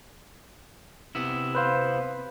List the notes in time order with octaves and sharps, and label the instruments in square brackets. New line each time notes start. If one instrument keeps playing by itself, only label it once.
[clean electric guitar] C3 B3 E4
[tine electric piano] B4 C5 F5